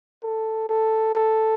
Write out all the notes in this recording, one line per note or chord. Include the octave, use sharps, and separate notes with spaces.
A4
A4
A4